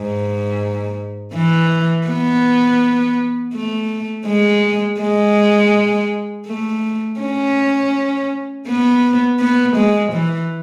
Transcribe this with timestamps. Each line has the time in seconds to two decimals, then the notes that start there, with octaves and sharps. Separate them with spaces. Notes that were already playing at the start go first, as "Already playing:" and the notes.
Already playing: G#2
1.34 E3
2.07 B3
3.54 A3
4.27 G#3
5.01 G#3
6.47 A3
7.21 C#4
8.67 B3
9.40 B3
9.77 G#3
10.13 E3